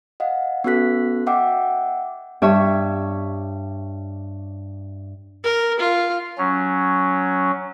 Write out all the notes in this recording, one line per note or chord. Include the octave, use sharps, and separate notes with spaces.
D#5 F5 F#5
B3 C#4 F#4 A4 F#6 B6
D#5 E5 F#5 G5 D6 E6
G2 C#5 E5
A#4
F4
F#3 C#4